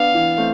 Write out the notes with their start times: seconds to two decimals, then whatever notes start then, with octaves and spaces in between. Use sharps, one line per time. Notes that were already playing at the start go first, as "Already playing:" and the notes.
Already playing: B3 D4 F5
0.14 E3
0.38 A3 C4